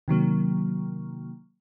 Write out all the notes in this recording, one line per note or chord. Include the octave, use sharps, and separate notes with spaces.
C3 D#3 F#3 A#3